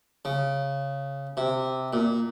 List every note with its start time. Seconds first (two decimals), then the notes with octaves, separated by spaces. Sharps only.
0.25 C#3
1.37 C3
1.93 A#2